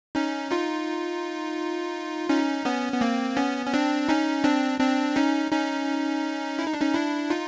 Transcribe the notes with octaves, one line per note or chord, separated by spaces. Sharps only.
C#4 D#4
D#4 F4
C#4 D#4
B3 C#4
B3
A#3 C4
B3 C#4
C#4
C4 D4
C#4 D#4
C4 D4
C4 D4
C#4 D#4
C#4 D#4
E4
D#4
D4
C#4 D#4
D4 E4
D#4 F4